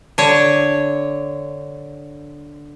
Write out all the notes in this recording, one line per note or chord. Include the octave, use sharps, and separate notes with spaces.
D3 C#5